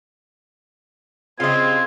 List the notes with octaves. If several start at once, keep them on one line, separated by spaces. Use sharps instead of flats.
C#3 G3 C4 F4 D#5 G#6